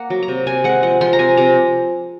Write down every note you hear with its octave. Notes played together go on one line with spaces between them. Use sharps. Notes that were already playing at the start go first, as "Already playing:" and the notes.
Already playing: A#3 F#5
F#3
A#5
C3
C3 G#5
G#3 F#5
F3 F#5
F3 C6
A#5
C3 G#5
C3 A#5